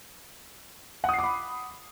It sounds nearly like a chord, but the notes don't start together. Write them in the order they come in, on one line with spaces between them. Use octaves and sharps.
F#5 D#6 C7 D6 B5